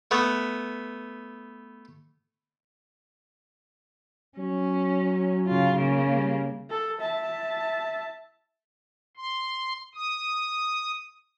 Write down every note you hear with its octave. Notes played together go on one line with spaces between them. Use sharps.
A3 B3
F#3 C#4
C#3 F4
C#3 A#3
G3
A4
E5 A5
C6
D#6